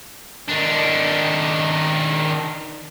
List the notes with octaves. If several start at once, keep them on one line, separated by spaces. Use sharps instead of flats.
D#3 D4